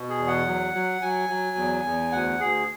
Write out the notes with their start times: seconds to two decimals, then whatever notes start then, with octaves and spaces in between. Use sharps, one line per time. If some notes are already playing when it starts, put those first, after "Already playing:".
Already playing: B2
0.09 G#4
0.18 E2
0.27 F#5
0.46 F#3
0.74 F#3
1.02 F#3 G#5
1.29 F#3
1.57 E2
1.84 E2
2.12 D2 F#5
2.40 D2 G#4